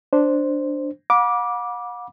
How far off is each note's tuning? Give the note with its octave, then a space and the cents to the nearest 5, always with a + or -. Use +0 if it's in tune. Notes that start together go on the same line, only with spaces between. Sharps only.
D4 +0 C5 +0
F#5 -45 B5 -35 D6 +0